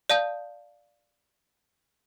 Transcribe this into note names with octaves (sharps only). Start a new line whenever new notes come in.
D5 F5 A5 D#6 G6